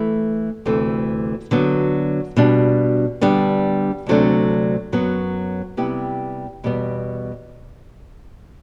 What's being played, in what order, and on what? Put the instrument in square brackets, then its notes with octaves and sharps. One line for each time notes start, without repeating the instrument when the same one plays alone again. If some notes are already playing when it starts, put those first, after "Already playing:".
Already playing: [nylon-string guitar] E3 A3 E4
D2 C3 E3 A3
D3 F#3 B3
B2 G3 D4
D3 G3 B3 D4
D2 C3 F#3 A3 D4
F#2 F#3 B3
C3 G3 B3 E4 G4
E2 B2 G3 B3